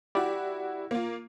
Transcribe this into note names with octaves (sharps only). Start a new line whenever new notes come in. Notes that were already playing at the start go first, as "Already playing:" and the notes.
E4 F#4 G4 D5
A#3 F4